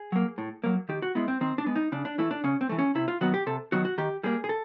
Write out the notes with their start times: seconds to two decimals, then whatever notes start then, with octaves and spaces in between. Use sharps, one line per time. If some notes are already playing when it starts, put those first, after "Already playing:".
Already playing: G#4
0.12 F#3 A#3
0.38 A2
0.64 F#3 A#3
0.89 D#3 G4
1.02 F#4
1.15 G#3 B3 E4
1.28 C4
1.41 D#3 C4
1.58 D4
1.66 G#3 B3
1.76 D#4
1.92 C#3 D4
2.05 D4
2.18 E3 A3 E4
2.31 D4
2.44 C#3 C#4
2.61 C4
2.69 E3 A3
2.79 C#4
2.95 C3 E4
3.08 F4
3.21 D#3 F#3 B3 F#4
3.34 G4
3.46 C3 A4
3.72 D#3 F#3 B3 F#4
3.85 F#4
3.98 D#3 G4
4.23 G3 A#3 G#4
4.44 G#4
4.49 A4